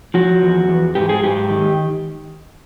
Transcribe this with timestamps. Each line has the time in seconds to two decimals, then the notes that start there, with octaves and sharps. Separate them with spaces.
0.14 F3 F#4
0.42 E2
0.69 E2
0.95 G#2 G4
1.09 G#4
1.23 G#2 G4
1.50 D#3